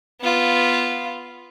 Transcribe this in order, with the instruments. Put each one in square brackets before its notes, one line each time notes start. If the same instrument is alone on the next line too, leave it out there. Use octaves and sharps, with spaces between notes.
[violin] B3 F4